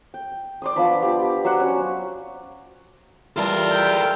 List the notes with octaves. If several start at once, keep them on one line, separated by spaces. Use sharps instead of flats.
G5
D5 C6 D#6
F3 B3 D4 B5
G4 B5
F#3 C5 F5 F#5
C#4
E3 G3 F4 A4 A#4 A5
E5 G5